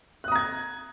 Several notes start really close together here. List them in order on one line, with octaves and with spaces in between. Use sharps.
F#6 D#6 A#5 G#6